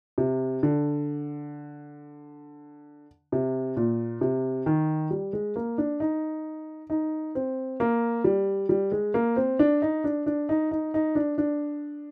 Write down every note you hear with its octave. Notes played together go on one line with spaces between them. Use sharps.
C3
D3
C3
A#2
C3
D#3
G3
G#3
A#3
D4
D#4
D#4
C4
A#3
G3
G3
G#3
A#3
C4
D4
D#4
D4
D4
D#4
D#4
D#4
D4
D4